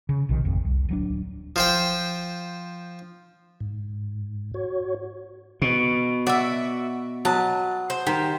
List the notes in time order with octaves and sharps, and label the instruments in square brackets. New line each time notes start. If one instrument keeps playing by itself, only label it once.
[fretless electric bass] C#3
A#1 C3 D#3
G#1 F2
C2
D1 F#3 D4
[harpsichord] F3 C5 G5
[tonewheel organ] G#2
F#4 C#5
[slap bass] B2
[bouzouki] F#4 E5 [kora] D5
[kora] F#3 B4 D#5 [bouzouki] A5
[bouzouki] C5
[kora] D#3 C5 [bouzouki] G4